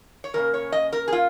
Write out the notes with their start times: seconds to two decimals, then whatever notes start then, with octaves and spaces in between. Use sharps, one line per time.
0.24 C#5
0.34 C#3 A#3 C#4 A#4
0.54 C#5
0.72 D#5
0.92 A#4
1.08 G#4
1.13 F4